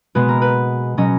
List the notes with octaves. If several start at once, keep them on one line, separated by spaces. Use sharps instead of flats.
B2 G#3 B3 B4
A#4
B4
B2 F#3 C#4 D#5